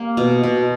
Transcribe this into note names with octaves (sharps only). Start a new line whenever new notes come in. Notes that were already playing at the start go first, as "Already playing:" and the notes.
Already playing: G3 A#3
B2
B2